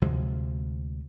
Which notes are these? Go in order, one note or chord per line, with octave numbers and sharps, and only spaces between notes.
D2 C3 F3 G#3